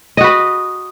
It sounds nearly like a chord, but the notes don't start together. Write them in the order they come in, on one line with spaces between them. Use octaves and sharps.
D#5 F#4 B4